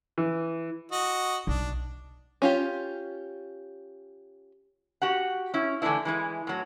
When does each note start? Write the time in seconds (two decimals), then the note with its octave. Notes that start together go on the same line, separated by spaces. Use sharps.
0.18 E3
0.92 F#4 D#5
1.47 B1 D4
2.42 C#4 F4 G4
5.02 F#4 G4 F#5
5.54 C#4 E4
5.82 D3 E3 F3 A3 D4 E4
6.05 E3 G#3 E4
6.47 A2 F#3